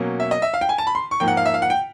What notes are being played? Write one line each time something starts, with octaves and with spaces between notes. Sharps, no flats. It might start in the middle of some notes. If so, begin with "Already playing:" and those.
Already playing: B2 F#3 A#3 C#4
E5
D#5
E5
F5
G5
G#5
A5
B5
C6
C#6
G#2 F3 A#3 G5
F#5
F5
E5
F5
F#5
G5